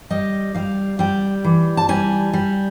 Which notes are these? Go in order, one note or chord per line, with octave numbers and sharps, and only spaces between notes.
G3 D#5
G3 F5
G3 G5
E3
A5
G3 G#5
G3